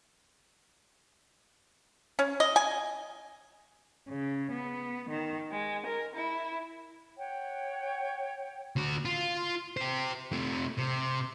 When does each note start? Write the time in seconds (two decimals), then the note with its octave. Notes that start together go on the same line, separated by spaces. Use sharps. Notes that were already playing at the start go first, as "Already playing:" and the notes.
2.19 C#4
2.40 D#5
2.56 G#5
4.09 C#3
4.52 B3
5.09 D#3
5.50 G#3
5.85 A#4
6.14 E4
7.18 C#5 F#5 G5
8.76 D2 F#4
9.05 F4
9.77 G4 C5
10.32 C3 A3
10.78 C3